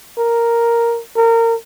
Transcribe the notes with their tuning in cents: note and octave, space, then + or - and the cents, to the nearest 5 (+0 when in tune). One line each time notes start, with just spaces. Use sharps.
A#4 +0
A#4 -25